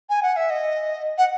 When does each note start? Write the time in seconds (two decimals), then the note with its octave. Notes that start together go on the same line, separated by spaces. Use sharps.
0.10 G#5
0.23 F#5
0.36 E5
0.50 D#5
1.18 F#5